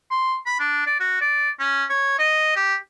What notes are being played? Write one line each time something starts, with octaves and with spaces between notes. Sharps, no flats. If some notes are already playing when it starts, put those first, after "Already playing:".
C6
B5
D4
D5
F#4
D5
C#4
C#5
D#5
G4